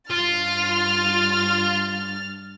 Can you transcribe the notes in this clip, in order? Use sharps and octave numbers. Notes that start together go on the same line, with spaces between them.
G2 F4 F6 A6